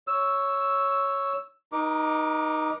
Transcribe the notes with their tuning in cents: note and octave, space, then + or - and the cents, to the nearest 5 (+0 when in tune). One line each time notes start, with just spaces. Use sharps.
C#5 +0 E6 +0
D#4 +0 A#4 +45 D6 +0